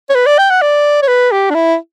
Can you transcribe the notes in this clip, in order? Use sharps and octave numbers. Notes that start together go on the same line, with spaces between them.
C#5
B4
D5
G5
F#5
D5
C#5
B4
G4
D4
E4